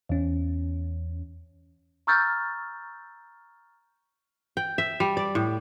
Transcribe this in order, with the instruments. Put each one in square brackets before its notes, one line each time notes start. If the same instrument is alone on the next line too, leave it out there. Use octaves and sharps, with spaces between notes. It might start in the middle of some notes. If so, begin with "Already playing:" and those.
[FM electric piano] E2 C#4
[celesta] A#5 C#6 E6 F6 G6 A6
[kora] G5
E5
G3
D5
A2